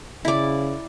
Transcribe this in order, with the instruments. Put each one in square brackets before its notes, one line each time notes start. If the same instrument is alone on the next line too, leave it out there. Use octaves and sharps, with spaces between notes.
[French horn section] C#3 [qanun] E4 D5